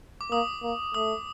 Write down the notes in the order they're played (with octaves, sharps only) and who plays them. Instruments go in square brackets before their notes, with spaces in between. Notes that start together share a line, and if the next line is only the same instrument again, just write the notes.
[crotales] D6
[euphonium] A#3 [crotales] D#6
[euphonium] A#3
[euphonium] A3 [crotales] D#6